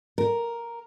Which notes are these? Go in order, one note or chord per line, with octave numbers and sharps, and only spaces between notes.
A#4